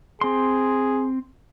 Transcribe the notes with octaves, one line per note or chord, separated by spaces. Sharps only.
C4 G#4 C6